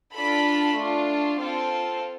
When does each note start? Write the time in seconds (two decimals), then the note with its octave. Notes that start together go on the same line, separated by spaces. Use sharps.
0.14 D4 F4 A4 B5
0.76 A3 D4 F4
1.38 C4 F4 A4